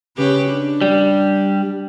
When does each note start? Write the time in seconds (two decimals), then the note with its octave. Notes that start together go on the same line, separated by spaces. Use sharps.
0.17 C#3 G4 B4
0.50 D4
0.81 G3